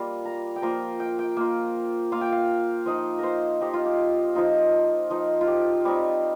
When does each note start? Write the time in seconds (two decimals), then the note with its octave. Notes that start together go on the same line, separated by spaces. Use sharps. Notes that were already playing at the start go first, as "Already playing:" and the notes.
Already playing: G3 A#3 F4
0.25 A#5
0.56 G5
0.62 F3 A#3 F4 A#5
1.00 G5
1.19 G5
1.37 A#3 F4
2.12 A#3 F4 F5
2.21 G5
2.32 F5
2.86 F3 D#4 D#5
3.18 A#4 C5
3.61 F3 D#4 G4
3.74 F4
3.85 G4
4.35 F3 D#4 F4
5.10 F3 D#4
5.41 F4
5.47 G4
5.85 G3 C4 D#4 G4